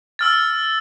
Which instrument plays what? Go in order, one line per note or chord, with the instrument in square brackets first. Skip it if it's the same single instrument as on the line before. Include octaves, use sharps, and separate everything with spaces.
[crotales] E6 F6 A6